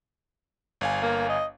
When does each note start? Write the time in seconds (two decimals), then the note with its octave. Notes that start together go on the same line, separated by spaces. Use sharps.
0.81 G1 F5 G#5
1.03 A#3
1.29 D#5